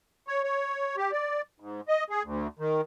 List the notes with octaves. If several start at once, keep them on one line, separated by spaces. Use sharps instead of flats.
C#5
C#5
G4
D5
G#2
D#5
G#4
D2
D#3